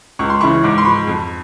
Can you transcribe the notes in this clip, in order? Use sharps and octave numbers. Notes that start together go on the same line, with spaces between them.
C#2 C#6
C6
C#3 E3 B5 C#6
G#2 D6
C#6
C6
F3 B5 C#6
F2